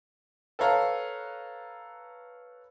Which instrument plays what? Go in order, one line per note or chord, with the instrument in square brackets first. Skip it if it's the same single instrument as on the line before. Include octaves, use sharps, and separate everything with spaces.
[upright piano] A4 B4 C#5 F5 A#5